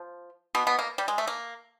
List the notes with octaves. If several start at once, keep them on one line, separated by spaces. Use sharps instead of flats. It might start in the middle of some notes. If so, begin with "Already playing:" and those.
Already playing: F3
B2 B3
B2 B3
A#3
G3
G#3
A3
A#3